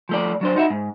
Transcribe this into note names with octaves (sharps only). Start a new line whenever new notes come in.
F3 A3 D5
F#3 D4 C5
D#4 F#4 E5
G#2